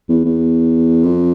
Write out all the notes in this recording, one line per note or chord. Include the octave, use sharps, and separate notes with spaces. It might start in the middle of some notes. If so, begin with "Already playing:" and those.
E2
E2
F2